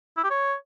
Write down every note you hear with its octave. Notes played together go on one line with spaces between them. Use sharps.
E4
G4
C#5